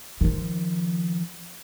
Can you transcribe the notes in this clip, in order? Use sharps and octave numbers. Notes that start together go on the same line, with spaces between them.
D#3 F3